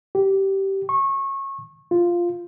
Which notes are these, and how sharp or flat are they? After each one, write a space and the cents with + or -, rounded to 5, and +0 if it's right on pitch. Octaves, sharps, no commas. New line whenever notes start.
G4 -15
C#6 -25
F4 -5